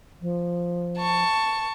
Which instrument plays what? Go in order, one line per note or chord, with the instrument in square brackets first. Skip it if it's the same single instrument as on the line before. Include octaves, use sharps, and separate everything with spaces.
[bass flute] F3
[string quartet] A5 C#6